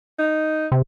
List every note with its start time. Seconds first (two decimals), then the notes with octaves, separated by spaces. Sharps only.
0.19 D#4
0.72 C3